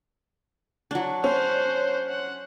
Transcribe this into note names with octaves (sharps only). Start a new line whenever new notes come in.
F#3 D4
C#4 C5 F#5
F#5